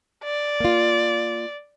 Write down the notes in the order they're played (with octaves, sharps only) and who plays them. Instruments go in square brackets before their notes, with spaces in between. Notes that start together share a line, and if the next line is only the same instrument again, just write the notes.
[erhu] D5
[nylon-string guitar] A#3 F4